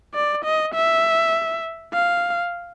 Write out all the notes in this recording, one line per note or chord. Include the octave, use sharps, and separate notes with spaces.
D5
D#5
E5
F5